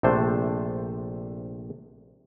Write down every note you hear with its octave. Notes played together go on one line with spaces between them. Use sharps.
A#1 C3 A3 D4 C5